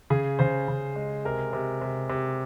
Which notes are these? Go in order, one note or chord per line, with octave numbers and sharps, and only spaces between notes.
C#3 G#4
C#3 C5
C#3
G#3
C3 A#4
C3
C3
C3